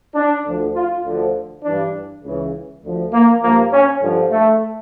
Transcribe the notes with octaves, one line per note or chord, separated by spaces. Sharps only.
D4
D2 D3 F3
F4
D2 D3 F3
G2 E3 D4
C#2 C#3 E3
D2 D3 F3
A#3
G2 F3 A#3
C#4
G2 D3 F3
A3